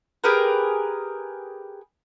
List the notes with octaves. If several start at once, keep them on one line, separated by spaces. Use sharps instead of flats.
G4 G#4 A#4 B4